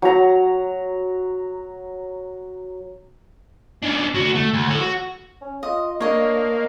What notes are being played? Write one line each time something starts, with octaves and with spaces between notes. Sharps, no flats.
F#3 A#5
C#4 D4
D2 F#4
A3
D2
A4 C#5
F#4
C#4
F4 D#5
A#3 D4 C#5 D#5